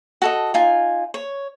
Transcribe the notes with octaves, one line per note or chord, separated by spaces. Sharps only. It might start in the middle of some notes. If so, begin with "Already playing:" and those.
F#4 A4 D#5
D#4 F4 G#5
C#5